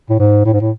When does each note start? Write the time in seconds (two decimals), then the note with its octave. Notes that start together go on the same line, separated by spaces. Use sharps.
0.10 A2
0.19 G#2
0.45 A2
0.53 G#2
0.61 A2